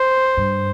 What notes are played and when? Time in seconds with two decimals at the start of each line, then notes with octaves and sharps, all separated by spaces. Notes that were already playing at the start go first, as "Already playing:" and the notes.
Already playing: C5
0.37 G2